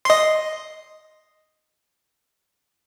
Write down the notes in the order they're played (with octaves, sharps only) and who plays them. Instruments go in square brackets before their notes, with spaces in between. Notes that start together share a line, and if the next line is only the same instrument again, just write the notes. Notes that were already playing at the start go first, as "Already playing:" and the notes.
[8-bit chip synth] D#5 C6